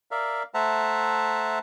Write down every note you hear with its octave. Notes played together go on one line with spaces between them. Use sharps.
A#4 D5 E5 F5
A3 C5 E5 F#5 A5 A#5